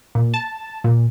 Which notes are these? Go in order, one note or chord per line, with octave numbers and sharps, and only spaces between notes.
A#2
A5
A#2